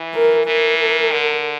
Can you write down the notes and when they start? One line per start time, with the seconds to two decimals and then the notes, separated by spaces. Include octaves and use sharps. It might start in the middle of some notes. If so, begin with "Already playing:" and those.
Already playing: E3
0.14 A#4
0.46 E3 A#4
1.12 D3